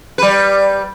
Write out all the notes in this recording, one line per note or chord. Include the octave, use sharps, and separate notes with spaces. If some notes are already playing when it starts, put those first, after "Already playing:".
G3 B4